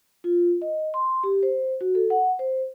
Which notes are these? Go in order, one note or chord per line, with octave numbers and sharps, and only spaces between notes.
F4
D#5
C6
G4
C5
F#4
A4
F#5
C5